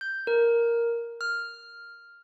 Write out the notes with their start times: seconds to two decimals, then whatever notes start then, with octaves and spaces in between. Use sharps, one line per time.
0.01 G6
0.27 A#4
1.21 F6